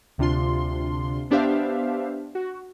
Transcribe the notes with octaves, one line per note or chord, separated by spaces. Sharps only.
D2 C3 D4 F4 C6
B3 D4 G4 C5 E5 F5
F#4